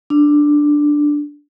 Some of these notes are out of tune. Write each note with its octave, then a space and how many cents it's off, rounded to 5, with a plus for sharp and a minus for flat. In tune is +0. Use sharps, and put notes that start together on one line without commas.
D4 +5